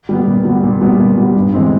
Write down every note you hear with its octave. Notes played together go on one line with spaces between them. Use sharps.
G3 B3
A#2
G3 B3
A#2
G3 B3
A#2
G3 B3
G2
E3 G#3 C4